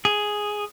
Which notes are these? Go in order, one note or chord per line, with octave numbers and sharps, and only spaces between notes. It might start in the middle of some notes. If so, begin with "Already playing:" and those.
G#4